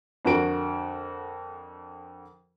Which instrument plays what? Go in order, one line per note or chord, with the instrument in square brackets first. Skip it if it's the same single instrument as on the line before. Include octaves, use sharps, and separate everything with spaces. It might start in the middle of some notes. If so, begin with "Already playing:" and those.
[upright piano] F2 D3 F#4 A#4 D7